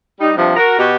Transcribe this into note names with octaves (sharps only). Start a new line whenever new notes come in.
G3 D#4
G2 C3 F3
F#4 A#4
B2 F#4 G4